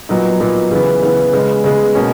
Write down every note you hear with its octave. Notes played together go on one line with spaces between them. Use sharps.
A#2 F#3 B3 D#4
A#2 F#3 B3 D#4
C#3 E3 B3
C#3 E3 B3
C#3 G#3 B3
C#3 G#3 B3
B2 A#3 C#4